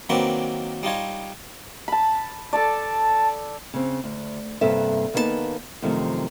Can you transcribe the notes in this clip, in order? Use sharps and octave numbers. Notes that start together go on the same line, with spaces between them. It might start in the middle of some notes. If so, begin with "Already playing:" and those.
D#3 F#3 A#3 C4 D4 B4
G3 D#4 F4 C#5
A5 B5
A4 D5 A5
C#3 C4
D2
G2 C3 A#3 B3 A4 E5
D#2 A#3 B3 D#4 G4 A5
F#2 C3 D#3 F3 A3